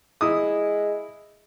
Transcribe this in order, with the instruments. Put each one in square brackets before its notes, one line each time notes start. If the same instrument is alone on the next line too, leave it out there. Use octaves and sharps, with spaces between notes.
[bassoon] G#3 [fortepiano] E4 D#6